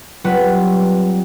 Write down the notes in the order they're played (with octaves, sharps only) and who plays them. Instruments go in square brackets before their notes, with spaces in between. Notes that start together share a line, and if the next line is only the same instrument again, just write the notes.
[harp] F#3 G3 C4 F4 B4 F#5